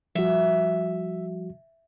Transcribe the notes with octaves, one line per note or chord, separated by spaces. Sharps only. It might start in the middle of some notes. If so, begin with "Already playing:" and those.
F3 G3 F#4 E5